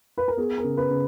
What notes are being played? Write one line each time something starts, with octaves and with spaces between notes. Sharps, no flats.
B4
A#4
B3 G#4
A#4
C#3
B4
C#3